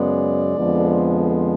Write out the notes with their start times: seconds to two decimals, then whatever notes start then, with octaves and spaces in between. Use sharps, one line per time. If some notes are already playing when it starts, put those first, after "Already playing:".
Already playing: F#2 C#3 G#3 B3 D5
0.57 F2 D3 F3 G#3 B3